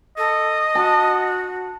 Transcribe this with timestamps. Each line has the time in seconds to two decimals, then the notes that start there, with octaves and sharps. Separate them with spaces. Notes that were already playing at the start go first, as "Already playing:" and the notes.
0.18 A4 D#5
0.75 F#4 A5